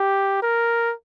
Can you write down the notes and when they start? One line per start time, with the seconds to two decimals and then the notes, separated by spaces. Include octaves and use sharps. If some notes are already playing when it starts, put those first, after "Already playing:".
Already playing: G4
0.42 A#4